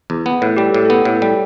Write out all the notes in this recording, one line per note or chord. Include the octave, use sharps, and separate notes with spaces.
E2
B3
A2 B4
G3 G4
A4
A2 G4
B3 A4
A2
G3